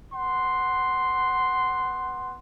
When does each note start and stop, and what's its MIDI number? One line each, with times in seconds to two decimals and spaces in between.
0.13 2.36 59
0.13 2.36 78
0.13 2.36 84